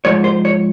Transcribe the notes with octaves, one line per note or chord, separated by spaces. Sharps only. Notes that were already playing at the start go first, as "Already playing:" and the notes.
G#2 F3 C#5
C5
C#5